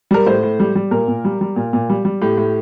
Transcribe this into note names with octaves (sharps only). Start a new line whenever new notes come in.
G3 A#4
A2 C5
A2
G3
G3
A#2 A#4
A#2
G3
G3
A#2
A#2
G3
G3
A2 G4
A2